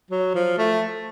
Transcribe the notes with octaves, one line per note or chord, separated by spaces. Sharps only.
F#3
F3
A3